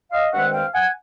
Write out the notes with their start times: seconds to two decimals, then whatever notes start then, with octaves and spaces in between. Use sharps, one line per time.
0.12 D#5 F5
0.33 G2 D#3 G#3 C4 E5 F#5
0.53 F5 G5
0.74 F#5 G#5